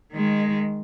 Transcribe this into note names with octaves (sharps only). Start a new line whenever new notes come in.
D#3 G#3